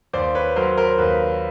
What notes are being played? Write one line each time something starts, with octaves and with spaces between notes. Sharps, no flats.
D#2 C5 D5
B4 C#5
F#3 A#4 C5
A#4 C5
D#2 B4